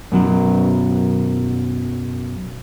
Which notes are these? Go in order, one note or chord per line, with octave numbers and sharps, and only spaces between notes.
F#2 B2 D#3 F#3